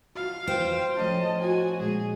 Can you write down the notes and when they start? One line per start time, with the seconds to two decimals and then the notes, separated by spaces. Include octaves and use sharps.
0.15 F4 F#4 F5
0.47 C5 G5
0.97 F3 A3 C#4 D#5 A5
1.41 F#4 G#5
1.80 A#2 G#3 G#4